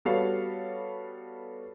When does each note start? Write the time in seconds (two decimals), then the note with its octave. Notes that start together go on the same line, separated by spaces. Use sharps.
0.05 G3 B3 F#4 A4 C#5 F5